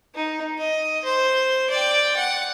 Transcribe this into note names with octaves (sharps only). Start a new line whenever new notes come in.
D#4
D#5
C5
D5 G5
F#5